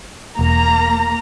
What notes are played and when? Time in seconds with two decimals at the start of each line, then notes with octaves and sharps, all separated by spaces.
0.39 E1 A#3 A#5